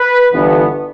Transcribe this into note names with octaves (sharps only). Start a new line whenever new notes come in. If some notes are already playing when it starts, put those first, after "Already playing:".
Already playing: B4
G1 G2 E3 B3